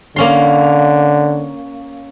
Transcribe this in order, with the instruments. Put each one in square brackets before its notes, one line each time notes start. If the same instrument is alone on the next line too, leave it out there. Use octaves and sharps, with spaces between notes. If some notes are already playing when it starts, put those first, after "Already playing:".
[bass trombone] D3 [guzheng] A#3 C#4 C6